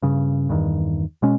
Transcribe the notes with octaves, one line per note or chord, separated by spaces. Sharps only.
G2 C#3
E2 G2 D#3
B2 G#3 C#4